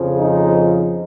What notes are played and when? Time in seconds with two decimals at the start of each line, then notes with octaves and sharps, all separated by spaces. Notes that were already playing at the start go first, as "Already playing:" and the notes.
Already playing: F2 C#3 F3
0.18 D#4